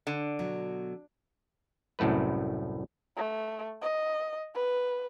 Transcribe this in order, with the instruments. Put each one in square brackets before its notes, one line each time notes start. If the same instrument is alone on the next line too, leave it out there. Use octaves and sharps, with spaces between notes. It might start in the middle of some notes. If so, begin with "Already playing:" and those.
[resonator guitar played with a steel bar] D3
[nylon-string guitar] B2 F#3
[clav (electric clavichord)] C2 F#2 A2 A3 B4
[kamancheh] A3
D#5
B4